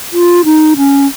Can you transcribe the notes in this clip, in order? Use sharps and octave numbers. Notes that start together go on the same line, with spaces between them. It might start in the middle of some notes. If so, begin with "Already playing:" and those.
F4
D#4
C#4